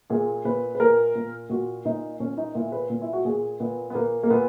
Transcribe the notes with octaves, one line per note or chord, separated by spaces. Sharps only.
A#2 G#4
A#2 B4
B4
A#2 A#4
A#2
A#2 F#4
A#2 D#4
A#2 C#4
D#4
A#2 E4
B4
A#2
E4
F#4
A#2 G#4
A#2 B3
B3
A#2 A#3
A#3
A#2 B3